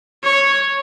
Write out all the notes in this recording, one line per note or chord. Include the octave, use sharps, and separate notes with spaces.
C#5